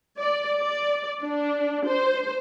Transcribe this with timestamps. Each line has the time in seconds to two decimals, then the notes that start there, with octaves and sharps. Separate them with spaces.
0.19 D5
0.59 D5
1.21 D4
1.89 C5